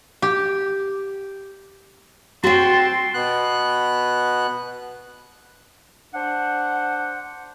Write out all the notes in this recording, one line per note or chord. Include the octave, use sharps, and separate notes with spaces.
G4
C4 F#4 G5 A5 C6
B2 B3 F#6
D4 C5 F#5